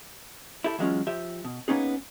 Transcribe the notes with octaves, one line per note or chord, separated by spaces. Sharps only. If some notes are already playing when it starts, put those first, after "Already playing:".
E4 G4 A4
E3 F#3 G#3 A3 C#4 F4
F3 G4 E5
B2
A#3 B3 C#4 D#4 G#4